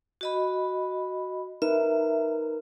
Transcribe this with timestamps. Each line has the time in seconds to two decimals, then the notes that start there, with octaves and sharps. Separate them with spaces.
0.21 F#4 D#5 B5
1.62 D#4 A#4 B4 E5